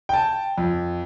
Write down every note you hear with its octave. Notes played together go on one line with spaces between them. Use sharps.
G5 A5
F2